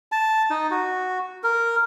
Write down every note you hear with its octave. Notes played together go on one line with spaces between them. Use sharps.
A5
D#4
F#4
A#4